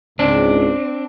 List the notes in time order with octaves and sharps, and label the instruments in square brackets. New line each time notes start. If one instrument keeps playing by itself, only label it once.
[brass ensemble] C#2 G#2 [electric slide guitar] C4 D4